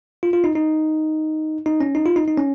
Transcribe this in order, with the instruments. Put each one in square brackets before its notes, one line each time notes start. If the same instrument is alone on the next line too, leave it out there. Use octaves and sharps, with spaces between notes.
[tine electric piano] F4
F4
D#4
D#4
D#4
C#4
D#4
F4
D#4
D#4
C#4